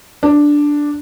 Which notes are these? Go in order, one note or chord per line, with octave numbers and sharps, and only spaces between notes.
D4